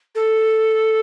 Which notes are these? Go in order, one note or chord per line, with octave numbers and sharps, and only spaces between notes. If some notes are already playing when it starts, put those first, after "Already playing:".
A4